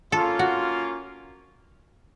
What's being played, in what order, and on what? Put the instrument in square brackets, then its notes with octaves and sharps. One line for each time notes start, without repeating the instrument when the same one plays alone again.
[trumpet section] A#3 C#4 F4 [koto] A4
[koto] F#4